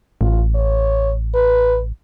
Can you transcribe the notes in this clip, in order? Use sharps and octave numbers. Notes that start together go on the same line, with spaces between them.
A1 F4
C#5
B4